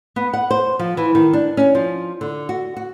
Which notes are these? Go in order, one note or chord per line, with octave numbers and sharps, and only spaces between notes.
B3
F#5
C5
F3
E3
D#3
D4
C#4
F3
D3
F#4
F#4